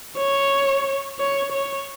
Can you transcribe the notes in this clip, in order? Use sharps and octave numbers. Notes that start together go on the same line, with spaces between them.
C#5
C#5
C#5